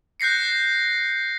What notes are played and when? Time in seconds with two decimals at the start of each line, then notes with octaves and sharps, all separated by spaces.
0.20 F#6 G6 A#6 C7 C#7